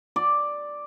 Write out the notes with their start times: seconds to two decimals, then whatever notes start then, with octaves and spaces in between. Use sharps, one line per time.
0.16 D5